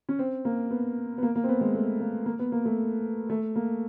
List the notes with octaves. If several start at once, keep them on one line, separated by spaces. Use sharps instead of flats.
C#4
C4
A#3
B3
B3
A#3
A#3
C4
B3
G#3
A3
A#3
A#3
B3
A#3
A3
A3
A#3